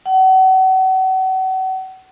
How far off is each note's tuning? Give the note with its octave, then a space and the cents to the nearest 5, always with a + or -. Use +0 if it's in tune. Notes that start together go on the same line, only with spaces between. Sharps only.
F#5 +35